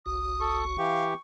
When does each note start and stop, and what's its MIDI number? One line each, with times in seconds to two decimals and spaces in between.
0.06 0.77 30
0.06 0.77 36
0.06 0.77 66
0.06 0.58 87
0.41 0.64 69
0.41 1.20 85
0.78 1.14 52
0.78 1.14 67
0.78 1.04 77